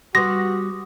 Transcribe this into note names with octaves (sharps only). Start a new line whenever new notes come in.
G3 B3 F#4 C6 D6 D#6 A#6